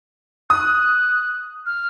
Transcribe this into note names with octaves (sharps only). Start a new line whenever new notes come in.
D#6 F#6
F6